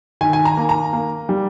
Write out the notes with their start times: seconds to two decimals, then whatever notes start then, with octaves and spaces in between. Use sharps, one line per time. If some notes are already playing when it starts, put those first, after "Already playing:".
0.21 D#3 G#5
0.33 G#5
0.45 A#5
0.57 A#3
0.69 A#5
0.93 A#3
1.29 G3